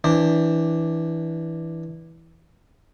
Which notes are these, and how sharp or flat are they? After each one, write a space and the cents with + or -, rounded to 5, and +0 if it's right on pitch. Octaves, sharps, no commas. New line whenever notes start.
E3 -10 D4 +0 C5 +15